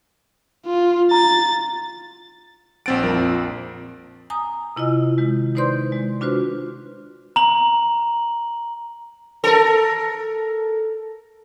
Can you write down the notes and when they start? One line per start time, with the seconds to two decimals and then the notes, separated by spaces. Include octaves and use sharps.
0.66 F4
1.11 A#5 A6
2.86 A#1 C4 F#5 A6 D7
3.03 F2 A#4
4.30 G#5 A#5 D#6
4.76 C3 E4 F4 D#5
5.18 D#3 G#3
5.55 D#4 B4 C5 D5 C6 G6
5.92 G#3
6.21 D4 F4 F#4 B4 C5
7.36 A#5 F#7
9.44 A4 A#4